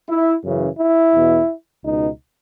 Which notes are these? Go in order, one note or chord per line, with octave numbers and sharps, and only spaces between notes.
E4
F#2 C#3 E3
E4
E2 B2
C#2 B2 D#4